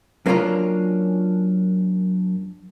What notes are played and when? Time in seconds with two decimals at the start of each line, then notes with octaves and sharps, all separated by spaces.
0.26 F#2 A#3 C#4 D4 F4 A#5